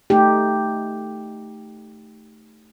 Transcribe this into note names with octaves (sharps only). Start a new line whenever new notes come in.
A3 D#4 G4